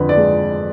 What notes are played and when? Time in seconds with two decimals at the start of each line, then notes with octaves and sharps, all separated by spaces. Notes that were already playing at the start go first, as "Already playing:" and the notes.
Already playing: F2 D3 B4
0.09 D5
0.17 G#3